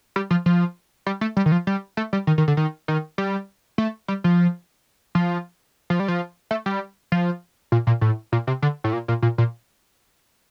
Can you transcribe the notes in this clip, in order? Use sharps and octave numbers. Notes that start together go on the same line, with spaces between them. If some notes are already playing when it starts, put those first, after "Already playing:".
G3
F3
F3
G3
A3
G3
D#3
F3
G3
A3
G3
D#3
D#3
D3
D#3
D#3
G3
A3
G3
F3
F3
F3
G3
F3
A3
G3
F3
A#2
A#2
A2
A#2
C3
D3
A2
A#2
A#2
A#2
A#2